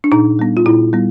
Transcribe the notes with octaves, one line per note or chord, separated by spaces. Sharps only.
D4
A#2 D#4
G3 B3
F4
A#2 E4
G3 B3